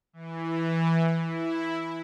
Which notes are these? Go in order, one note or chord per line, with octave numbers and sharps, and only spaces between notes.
E3
E4